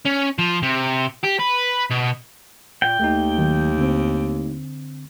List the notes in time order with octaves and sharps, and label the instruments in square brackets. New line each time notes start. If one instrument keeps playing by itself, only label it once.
[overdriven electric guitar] C#4
F3
C3
G4
B4
B2
[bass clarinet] A#2 [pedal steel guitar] G5
[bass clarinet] D#2 [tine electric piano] A3 D#4
[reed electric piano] D#3 F#3
D3 C4